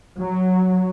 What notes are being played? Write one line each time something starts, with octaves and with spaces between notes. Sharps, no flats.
F#3